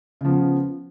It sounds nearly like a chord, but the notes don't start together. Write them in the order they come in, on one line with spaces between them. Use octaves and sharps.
C#3 F3 B3